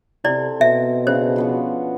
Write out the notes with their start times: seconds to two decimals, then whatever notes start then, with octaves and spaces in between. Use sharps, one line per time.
0.24 C3 C4 E4 A4 D5
0.61 B2 E5
1.07 C#3 D4 C5
1.36 F3 B3 F#4